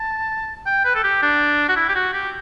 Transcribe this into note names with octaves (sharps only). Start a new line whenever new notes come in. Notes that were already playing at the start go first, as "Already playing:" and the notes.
Already playing: A5
G5
B4
A4
G4
D4
F#4
E4
G4
F#4
G4